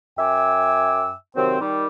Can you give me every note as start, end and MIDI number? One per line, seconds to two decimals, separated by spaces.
0.18 1.12 42
0.18 1.12 76
0.18 1.12 79
0.18 1.12 80
0.18 1.12 86
0.18 1.12 88
1.36 1.57 48
1.36 1.57 51
1.36 1.57 54
1.36 1.57 60
1.61 1.88 51
1.61 1.88 55